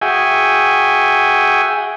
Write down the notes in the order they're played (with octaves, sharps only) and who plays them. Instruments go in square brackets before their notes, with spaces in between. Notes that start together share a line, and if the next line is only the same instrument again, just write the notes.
[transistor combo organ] F#4 G#4 E5 G5 G#5